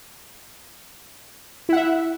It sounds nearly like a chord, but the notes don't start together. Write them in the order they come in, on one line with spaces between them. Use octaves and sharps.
E4 F#5 E5